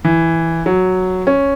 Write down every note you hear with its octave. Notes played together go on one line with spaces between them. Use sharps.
E3
F#3
C#4